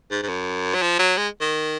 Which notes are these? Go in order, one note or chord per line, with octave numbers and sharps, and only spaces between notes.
G#2
G#2
F#2
F#3
F3
F#3
G#3
D#3